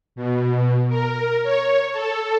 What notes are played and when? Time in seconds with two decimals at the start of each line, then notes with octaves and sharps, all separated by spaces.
0.16 B2
0.89 A#4
1.43 C#5
1.93 A4